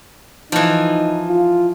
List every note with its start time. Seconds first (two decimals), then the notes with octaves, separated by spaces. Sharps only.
0.52 E3 F3 D#4
1.29 F4